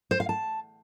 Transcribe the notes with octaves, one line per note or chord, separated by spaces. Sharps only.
C5
F5
A5